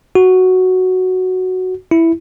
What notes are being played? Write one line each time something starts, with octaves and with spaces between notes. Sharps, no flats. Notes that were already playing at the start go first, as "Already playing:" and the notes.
F#4
E4